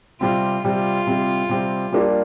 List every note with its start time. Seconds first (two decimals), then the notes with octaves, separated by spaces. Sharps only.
0.21 C3 G3 C4 F4
0.64 C3 G3 C4 F4
1.07 C3 G3 C4
1.49 C3 G3 C4
1.93 G3 A#3 D4 F4